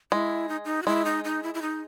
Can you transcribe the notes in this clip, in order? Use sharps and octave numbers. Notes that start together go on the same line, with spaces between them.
G#3 E4
D#4
D#4
F#4
G#3 E4
D#4
D#4
E4
E4
D#4